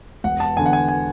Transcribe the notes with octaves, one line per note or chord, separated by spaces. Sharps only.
E1 F#5
A5
E2 D3 G#5
F#5
G#5
G#5